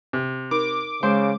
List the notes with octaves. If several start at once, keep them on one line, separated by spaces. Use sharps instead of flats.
C3
D#4 A#4 D6
C#3 G#3 C5 F5